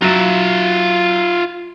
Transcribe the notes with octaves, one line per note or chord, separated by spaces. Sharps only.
F#3 F4 E5